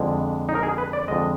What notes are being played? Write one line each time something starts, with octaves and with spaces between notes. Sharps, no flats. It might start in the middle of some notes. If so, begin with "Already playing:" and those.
Already playing: F2 D3 G#3
D#4
A#4
G#4
B4
D5
F2 D3 G#3 D#5